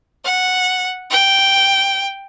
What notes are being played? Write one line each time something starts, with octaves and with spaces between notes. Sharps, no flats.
F#5
G5